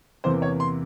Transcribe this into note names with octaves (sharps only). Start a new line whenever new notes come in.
E2 C3 E3 A#3 C5
C#5
C6